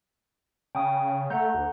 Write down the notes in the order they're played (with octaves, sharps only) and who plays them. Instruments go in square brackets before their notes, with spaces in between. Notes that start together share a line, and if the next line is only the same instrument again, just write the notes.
[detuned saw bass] C#3 [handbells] G5 D#6
[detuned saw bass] A3 [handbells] F#5 A#5 G6
[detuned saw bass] D2